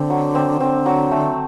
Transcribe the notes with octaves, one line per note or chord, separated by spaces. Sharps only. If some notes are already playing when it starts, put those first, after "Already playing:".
Already playing: D3 C4
F#3
C4
D3 C4
F#3
A3